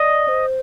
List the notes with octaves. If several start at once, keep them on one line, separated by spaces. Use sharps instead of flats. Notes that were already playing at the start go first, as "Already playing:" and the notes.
Already playing: D5 D#5
C5